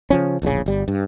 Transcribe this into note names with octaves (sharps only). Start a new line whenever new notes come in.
C#3 F3 C#4
D1 A#1 A#2 C#3
G1 G3
G2